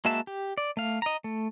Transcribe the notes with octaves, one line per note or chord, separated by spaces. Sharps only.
G#3 A#3 F#4 E5 A5
G4
D5
A3 F5
D#5 A#5
A3